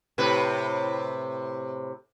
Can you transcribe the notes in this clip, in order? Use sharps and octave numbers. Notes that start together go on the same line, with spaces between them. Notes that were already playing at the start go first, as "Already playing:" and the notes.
A2 C3 B4